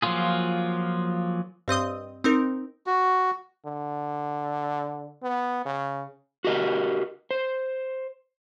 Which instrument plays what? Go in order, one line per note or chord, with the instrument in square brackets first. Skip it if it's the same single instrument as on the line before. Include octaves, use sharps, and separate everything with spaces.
[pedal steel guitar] F3 F#3 A#3 F4 G#4
[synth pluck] G2 C4 D#5 D#6
C4 D#4 A#4
[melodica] F#4
[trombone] D3
B3
C#3
[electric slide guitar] F#4 G4 A#4 D#5
C5